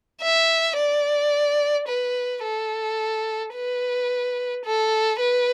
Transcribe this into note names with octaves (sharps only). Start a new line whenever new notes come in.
E5
D5
B4
A4
B4
A4
B4